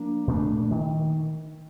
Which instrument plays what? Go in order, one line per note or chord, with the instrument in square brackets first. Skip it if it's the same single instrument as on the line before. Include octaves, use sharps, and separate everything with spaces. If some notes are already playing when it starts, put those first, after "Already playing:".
Already playing: [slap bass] F3 A#3 D4
A#2 A3 D4
D#3